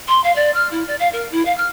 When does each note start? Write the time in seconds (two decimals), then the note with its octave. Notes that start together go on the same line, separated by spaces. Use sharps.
0.08 C6
0.24 F5
0.35 D5
0.54 F6
0.71 E4
0.87 D5
0.99 F5
1.13 A#4
1.31 E4
1.45 F5
1.57 F6